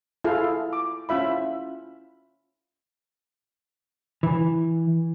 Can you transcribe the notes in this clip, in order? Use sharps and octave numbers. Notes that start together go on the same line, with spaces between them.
E4 F4 G#4 A4 F5
D6
C#4 E4 F4 E5 B5
E3